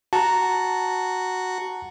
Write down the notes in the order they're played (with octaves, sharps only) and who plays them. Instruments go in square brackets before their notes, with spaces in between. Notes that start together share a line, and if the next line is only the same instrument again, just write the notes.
[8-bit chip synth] F#4 [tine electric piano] A5 A#5